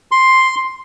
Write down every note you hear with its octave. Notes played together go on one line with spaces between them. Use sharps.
C6